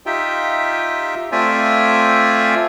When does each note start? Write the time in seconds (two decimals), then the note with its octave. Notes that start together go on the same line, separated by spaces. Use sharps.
0.06 D#4 F4 G4 E5 G5
1.32 A3 C4 F4 D5 E5 G#5